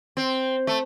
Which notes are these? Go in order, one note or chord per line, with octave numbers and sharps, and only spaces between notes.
C4
A3